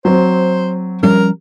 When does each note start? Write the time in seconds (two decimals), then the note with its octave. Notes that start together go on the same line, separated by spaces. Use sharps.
0.05 F#3 C4 C5
1.03 F3 G3 C#4 A#4